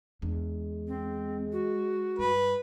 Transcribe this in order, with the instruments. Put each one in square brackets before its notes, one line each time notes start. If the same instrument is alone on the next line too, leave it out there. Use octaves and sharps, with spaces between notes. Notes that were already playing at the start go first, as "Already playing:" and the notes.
[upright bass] E2 D4 [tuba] G#3
[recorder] C4
F#4
[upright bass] G2 [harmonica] B4